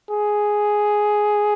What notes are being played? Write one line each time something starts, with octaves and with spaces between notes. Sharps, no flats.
G#4